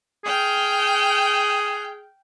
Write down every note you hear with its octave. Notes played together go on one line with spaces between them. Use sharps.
G#4 G5 F6 G6